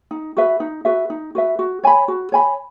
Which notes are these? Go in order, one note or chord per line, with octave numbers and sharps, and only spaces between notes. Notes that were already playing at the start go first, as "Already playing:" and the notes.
D#4
F#4 B4 E5
D#4
F#4 B4 E5
D#4
F#4 B4 E5
F#4
C#5 G#5 B5
F#4
C#5 G#5 B5